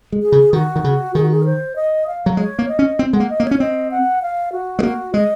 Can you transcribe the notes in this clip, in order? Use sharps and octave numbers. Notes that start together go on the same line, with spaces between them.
G#3
G#4
C#3
D#3 F#4
D#3
C#3
D#3 G#4
F#4
G#4
A#4
C5
D#5
F5
F#3
G#3 C#5
A#3
D#5
C#4
C4
G#3 F#5
A#3
D#5
A#3
C#5
C#4
C4 D#5
F#5
F5
F#4
G#3
A#3 F#4
G#3 D#5